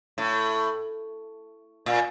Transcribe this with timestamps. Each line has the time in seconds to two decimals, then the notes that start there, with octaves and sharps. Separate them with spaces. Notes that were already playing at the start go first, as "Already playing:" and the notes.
0.18 A2
1.86 A#2